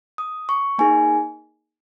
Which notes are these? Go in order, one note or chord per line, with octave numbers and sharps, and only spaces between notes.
D#6
C#6
A#3 D#4 G#4 G#5